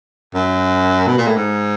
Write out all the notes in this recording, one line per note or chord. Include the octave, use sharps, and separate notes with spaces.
F#2
B2
A#2
A2
G#2